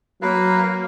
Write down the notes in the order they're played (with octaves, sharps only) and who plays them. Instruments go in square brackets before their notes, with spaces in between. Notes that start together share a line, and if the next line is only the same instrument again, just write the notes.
[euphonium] F#3 [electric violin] A#3 [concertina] A#4 B4 F5